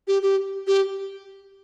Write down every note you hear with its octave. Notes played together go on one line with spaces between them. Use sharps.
G4
G4
G4